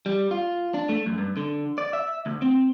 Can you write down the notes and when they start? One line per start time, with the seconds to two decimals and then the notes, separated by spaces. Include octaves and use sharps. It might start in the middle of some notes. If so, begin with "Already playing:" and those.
0.06 G3
0.31 F4
0.74 D4
0.89 A3
1.06 F#2
1.18 G2
1.37 D3
1.78 D5
1.93 E5
2.26 D2
2.42 C4